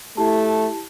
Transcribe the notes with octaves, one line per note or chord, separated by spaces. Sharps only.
A3 E4 G4 A5